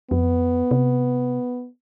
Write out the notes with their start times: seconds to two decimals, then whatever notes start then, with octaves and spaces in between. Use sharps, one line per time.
0.11 F2 B3
0.71 C3